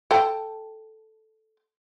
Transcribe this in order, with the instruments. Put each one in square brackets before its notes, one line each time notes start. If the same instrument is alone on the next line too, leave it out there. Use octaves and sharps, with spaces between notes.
[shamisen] A4 G5 A5